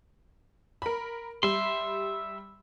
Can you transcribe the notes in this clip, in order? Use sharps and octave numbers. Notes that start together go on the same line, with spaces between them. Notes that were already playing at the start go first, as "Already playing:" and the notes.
A#4 B5
G3 E5 C6